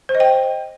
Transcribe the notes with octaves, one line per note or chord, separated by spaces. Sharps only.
C5
D#5
G5